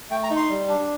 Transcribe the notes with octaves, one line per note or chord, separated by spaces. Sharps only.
A3 G5
A#5
D#4
C6
G3
D4